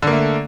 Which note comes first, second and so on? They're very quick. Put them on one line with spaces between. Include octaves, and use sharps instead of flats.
D3 A#3 A3